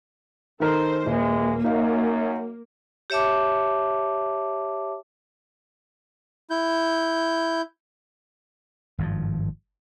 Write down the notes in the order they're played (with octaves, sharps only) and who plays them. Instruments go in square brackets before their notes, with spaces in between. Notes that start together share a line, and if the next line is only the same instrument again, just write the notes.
[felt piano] D#3 D#4 A#4 [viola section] A4 C5
[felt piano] D#1 [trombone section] E3 G#3 [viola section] A#3
[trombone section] F#2 [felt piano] D#4 F5
[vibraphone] G4 C#5 E5 A5 D6
[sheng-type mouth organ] E4 G6
[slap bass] G#1 G2 D#3 F3